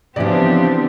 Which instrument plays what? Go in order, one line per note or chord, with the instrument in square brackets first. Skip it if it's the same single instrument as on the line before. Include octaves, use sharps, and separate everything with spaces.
[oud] C#3 F3 [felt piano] E3 D5 [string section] B3 C4 D4 [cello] G4